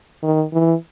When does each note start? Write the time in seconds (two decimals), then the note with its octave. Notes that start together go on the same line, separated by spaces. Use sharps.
0.23 D#3
0.53 E3